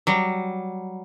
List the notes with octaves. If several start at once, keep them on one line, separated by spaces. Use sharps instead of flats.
F#3 G3